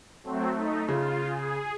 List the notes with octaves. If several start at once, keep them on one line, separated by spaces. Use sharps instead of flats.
F#3 A3 C4
A3 D#4
C#3 F4
G#4